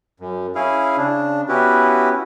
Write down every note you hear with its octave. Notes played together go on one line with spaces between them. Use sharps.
F#2
C#4 E4 G#4 F5
C#3 D4
B3 C#4 E4 F#4 G4 B4